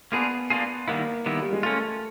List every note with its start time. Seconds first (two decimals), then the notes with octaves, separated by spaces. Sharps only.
0.12 A#3 B3 D4 F4 G#4
0.50 A#3 D4 F4 G#4
0.88 D#3 G3 A#3 B3 E4
1.26 D#3 G3 B3 E4
1.42 G3
1.53 G#3
1.63 A3 A#3 C#4 F4